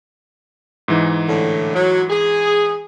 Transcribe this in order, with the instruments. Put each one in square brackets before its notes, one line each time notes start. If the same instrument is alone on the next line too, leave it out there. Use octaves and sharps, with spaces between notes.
[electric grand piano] G#2 E3 D#4
[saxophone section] A2 D3
F#3
G#4